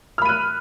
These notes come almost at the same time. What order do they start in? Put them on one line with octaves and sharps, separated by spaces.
F6 B5 D#7 F#6